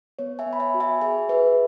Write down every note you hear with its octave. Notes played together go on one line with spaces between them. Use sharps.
B3 C#5
E5 G#5
B3
B5
E5 G#5
F#4
E5 G#5
G#4 E5 G#5
G#4 B4 E5